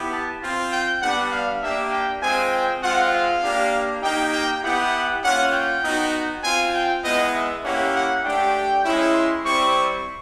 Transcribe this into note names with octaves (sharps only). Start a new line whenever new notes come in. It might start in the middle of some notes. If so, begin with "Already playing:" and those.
Already playing: B3 E4 G4
A5
C4 F4
G5
G3 B3 D4 F#5
F5
A#3 D4 G4 E5
G5
G#3 C4 F4 G#5
G5
G#3 C4 F4 F#5
F5
A#3 D4 G4
A#3 D#4 G4 G5
G5
B3 E4 G4 F#5
A#3 C#4 F4 F#5
G5
B3 D#4 F#4
C4 F4 G#5
G5
G#3 B3 E4 D#5
E5
A#3 C#4 E4 G4 F#5
F#5
A3 D4 G4 G5
G#3 C#4 E4
C6
G3 C4 E4 C#6